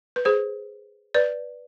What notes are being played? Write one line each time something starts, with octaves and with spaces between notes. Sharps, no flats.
B4
G#4 C5
B4 D5